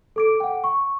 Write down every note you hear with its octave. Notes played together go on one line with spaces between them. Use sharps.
A4 D6 D7
F#5 G5
C#6